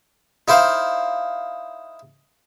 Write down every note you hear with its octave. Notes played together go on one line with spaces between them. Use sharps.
D#4 E4 C5 F5